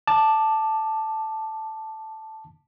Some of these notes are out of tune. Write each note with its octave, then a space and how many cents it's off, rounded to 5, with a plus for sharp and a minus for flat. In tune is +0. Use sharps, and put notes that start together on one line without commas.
A5 +0 D6 +15